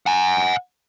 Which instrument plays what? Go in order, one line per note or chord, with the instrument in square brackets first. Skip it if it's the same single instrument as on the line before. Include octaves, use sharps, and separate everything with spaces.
[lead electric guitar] F#5 G#5